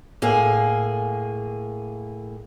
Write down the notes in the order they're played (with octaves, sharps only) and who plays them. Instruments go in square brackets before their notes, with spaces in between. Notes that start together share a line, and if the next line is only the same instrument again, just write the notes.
[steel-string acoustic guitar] A2 A#3 G#4